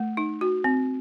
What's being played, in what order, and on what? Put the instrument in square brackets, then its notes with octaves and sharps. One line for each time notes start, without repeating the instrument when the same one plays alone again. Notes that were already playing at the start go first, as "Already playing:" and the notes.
Already playing: [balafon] A3
D#4
F#4
C4